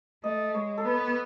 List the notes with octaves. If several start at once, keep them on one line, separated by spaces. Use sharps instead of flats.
A3 D#5
G#3 C#5
A4
B3 B4